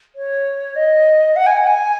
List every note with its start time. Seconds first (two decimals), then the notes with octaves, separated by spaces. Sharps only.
0.15 C#5
0.75 D#5
1.36 F#5
1.46 G#5
1.56 F#5
1.67 G#5